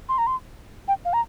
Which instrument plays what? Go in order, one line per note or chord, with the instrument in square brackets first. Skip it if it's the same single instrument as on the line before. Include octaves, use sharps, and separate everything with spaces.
[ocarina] C6
A#5
C6
G5
F5
A#5